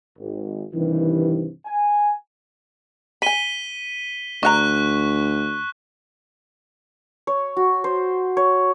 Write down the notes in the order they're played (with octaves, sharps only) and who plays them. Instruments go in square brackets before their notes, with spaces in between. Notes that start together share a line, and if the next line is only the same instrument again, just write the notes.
[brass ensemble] G#1
G2 C3 D#3 E3
G#5
[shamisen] G#5 B5 [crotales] B6 D#7 G7
[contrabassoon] D2 [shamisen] D4 F5 A#5 [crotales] C#6 F#6
[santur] C#5
F#4
C5
C#5